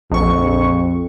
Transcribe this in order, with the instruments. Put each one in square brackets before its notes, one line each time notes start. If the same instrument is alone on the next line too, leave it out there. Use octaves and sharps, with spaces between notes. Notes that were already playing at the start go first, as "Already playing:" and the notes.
[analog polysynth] A#1 C#6 [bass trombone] F2